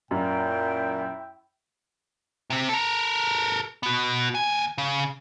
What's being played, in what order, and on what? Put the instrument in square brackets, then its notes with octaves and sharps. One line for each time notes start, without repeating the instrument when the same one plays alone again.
[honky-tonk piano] F#2 [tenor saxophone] A#2 [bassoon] E4 [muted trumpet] G5
[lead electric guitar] C3 C4
A4 A#4
B3 F#4
D#2 G#5
C#3